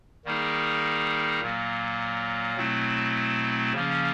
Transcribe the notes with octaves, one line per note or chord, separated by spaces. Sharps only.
D#3 G3 A#3 D#4 G#4
A#2 F#3 A#3
B2 F#3 A3 C4 E4
C#3 F3 A#3 C#4